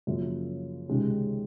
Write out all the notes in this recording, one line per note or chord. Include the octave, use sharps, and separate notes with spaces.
F#2 C#3 F3 A#3
C#2 C3 D#3 G#3 C#4